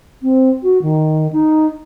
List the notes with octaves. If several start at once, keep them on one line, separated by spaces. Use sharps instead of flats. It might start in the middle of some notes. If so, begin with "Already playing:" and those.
C4
F#4
D#3
D#4